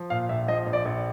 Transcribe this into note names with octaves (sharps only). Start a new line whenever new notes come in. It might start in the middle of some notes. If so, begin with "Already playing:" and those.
Already playing: F3
A#2 F5
A#1 E5
F3 D#5
A#1
D5
A#1